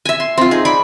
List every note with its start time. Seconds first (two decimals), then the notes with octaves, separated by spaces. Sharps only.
0.05 E5 G#5
0.20 C6
0.38 C4 F4
0.51 D#4 G#4
0.65 D5 B5 C#6